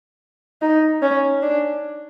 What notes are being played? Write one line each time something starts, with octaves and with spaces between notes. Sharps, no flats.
D#4
C#4
D4